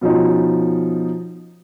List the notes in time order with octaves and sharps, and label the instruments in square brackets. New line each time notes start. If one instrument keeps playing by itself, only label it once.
[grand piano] B2 F3 C#4 D#4